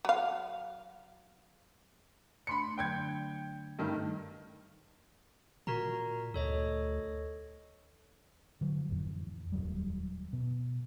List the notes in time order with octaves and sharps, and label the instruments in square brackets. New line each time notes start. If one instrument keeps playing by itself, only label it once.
[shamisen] F#3 F5
[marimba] A3 D4 [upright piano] B5 C6 C#7
[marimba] D3 F#3 D4 [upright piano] G5 G6 G#6
[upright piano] G2 D#3 A3
[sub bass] A#2 [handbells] F#4 A#4 A#5
[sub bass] D2 [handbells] A4 C#5 D#5
[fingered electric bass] D3 F#3
A1 F2
D#1 C#2 F#3 G3
B2